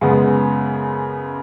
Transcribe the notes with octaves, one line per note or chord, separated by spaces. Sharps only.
F#2 C#3 G#3 B3